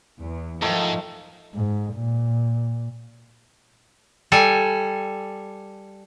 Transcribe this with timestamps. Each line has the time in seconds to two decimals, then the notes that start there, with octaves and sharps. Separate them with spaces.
0.20 E2
0.62 G#2 D#3 F3 A3
1.54 G#2
1.94 A#2
4.32 G3 A4 G#5